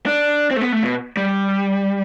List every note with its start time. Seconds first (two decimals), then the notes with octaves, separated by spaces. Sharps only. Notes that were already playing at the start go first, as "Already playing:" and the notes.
0.06 D4
0.51 C4
0.56 A3
0.62 B3
0.72 A3
0.84 B2
1.17 G3